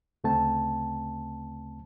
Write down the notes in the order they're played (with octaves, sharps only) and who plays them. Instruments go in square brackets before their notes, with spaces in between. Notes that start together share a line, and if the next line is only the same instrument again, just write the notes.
[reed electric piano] D2 C#3 A3 C4 G5 A5